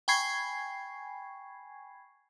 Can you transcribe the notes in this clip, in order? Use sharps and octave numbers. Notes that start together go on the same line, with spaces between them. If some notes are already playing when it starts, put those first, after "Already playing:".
G5 G#5 B5 C#6 G#6 C7